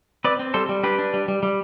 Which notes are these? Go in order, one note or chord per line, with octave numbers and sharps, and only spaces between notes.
C4 B4 D5
C4
G3 A4 C5
G3
D4 G4 B4
D4
G3
G3
G3